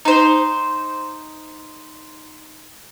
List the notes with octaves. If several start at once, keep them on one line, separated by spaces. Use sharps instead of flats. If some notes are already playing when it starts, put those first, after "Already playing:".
D#4 C5